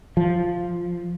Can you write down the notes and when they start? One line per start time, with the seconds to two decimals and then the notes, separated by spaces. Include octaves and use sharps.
0.17 F3